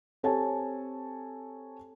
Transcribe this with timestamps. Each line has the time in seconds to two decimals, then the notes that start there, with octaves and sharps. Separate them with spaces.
0.23 C4 G4 A4 C#5 G#5 A5